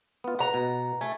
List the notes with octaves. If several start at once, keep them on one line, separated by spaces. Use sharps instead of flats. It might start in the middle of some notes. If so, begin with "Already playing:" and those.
B3 F4
B4 F#5 A#5
B2
A3 G#5